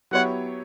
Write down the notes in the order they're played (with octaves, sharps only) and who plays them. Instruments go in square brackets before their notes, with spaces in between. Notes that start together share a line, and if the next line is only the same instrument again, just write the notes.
[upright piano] F#3 B3 E4 G4 C#5 [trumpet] F#5